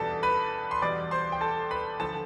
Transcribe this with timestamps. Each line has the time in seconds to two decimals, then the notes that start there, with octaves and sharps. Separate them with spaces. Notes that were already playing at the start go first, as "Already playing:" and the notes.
Already playing: E2 B2 G3 D4 A4 A5
0.23 B4 B5
0.71 C6
0.82 E2 B2 G3 D5 D6
1.11 C5 C6
1.32 G5
1.41 A4 A5
1.71 B4 B5
2.00 D3 F3 A4 A5